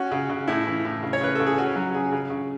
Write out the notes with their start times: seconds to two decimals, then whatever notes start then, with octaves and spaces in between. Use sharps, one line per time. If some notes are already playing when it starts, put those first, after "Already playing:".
Already playing: C#4 F#4
0.12 C#3
0.29 C#3
0.48 A2 E4
0.67 E3
0.85 A2
1.03 C#3
1.13 C#5
1.21 C#3 B4
1.35 C#3 A4
1.46 G#4
1.58 C#4 F#4
1.76 F#3 F#4
1.94 C#3 G#4
2.12 C#3
2.30 C#3